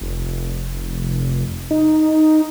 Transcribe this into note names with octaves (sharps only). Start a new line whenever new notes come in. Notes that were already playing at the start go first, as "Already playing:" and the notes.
F1
D#4